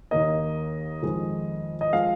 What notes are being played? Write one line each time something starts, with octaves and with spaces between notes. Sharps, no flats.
D#2 D#3 A#3 D#5
F2 D#3 G#3
D#5
F3 G#3 F5